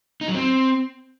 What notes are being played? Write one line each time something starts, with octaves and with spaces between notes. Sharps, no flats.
D#4
F#3
C4